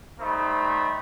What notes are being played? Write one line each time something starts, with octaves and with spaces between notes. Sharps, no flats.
G3 A3 D#4 C5 D#5 B5